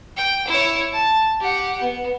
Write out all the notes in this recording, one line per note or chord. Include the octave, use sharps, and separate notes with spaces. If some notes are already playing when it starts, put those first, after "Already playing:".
G5
E4 C#5
A5
G4 F#5
B3